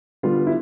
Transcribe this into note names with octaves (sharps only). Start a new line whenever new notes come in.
D3 G3 B3 F4
E4